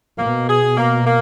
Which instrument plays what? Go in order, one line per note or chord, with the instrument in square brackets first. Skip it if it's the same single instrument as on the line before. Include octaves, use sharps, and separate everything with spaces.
[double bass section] B2 [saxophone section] A#3
[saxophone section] G#4
A#3
A#3